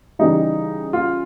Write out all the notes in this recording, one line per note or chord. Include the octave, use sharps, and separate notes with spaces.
C#3 E3 G3 D#4
F4